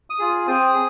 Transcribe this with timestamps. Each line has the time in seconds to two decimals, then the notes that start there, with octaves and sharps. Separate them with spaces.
0.10 D#6
0.19 F4 G#4
0.47 C4 D#6
0.74 G#4